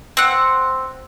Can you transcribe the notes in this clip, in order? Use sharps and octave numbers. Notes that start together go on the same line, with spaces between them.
C4 F#5